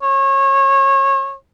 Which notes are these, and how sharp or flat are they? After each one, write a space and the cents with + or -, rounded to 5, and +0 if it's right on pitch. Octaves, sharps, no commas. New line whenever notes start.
C#5 -25